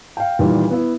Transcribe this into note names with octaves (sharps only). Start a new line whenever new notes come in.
F5 G5
A#2 D#3 E3 G3
B3 E4